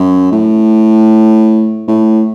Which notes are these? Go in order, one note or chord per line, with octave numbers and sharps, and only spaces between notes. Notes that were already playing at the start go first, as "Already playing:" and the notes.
Already playing: F#2
A2
A2